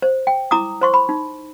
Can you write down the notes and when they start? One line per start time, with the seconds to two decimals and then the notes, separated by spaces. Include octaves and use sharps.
0.02 C5
0.27 G5
0.51 E4 A#5 D6 D#6
0.81 C5 C6 C#6
0.94 B5
1.09 D#4